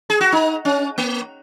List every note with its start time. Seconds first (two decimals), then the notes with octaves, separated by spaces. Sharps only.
0.10 G#4
0.21 F#4
0.32 D#4
0.65 C#4
0.98 A#3